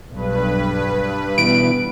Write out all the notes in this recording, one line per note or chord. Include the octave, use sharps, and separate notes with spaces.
B1 G2 B4
B2 E3 G3 B3 D7